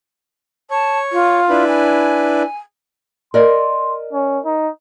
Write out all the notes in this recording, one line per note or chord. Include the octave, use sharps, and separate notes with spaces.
C#5 A5
F4
D4 E4 B4
G#5
A#4 D5 D#5 C6
C#4
D#4